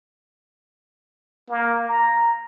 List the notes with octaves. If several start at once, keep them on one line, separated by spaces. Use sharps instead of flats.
A#3
A#5